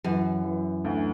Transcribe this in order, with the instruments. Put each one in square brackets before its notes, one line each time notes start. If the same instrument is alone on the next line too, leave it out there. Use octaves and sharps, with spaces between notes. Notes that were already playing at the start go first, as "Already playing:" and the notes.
[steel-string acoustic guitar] F#2 [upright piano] E3
[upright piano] E3
D2